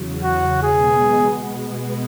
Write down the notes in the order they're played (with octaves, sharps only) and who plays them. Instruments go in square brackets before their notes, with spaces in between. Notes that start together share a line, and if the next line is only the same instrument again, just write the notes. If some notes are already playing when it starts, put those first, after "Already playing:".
Already playing: [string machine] E2 C#3 F#3
[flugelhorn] F#4
[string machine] B2 G#3 B3 [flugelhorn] G#4